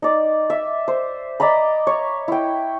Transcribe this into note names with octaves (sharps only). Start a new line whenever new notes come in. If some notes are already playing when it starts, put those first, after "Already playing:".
D#4 D5
E5
C5
D5 D#5 A#5 B5
C#5
E4 G5